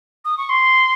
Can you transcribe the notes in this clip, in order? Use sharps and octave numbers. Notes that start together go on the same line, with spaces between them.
D#6
C#6
C6